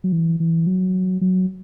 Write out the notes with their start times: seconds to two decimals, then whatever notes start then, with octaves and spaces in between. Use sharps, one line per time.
0.04 F#3
0.12 E3
0.40 E3
0.67 F#3
1.21 F#3